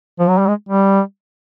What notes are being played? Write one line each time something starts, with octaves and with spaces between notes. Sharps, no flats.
F3
F#3
G3
G#3
G3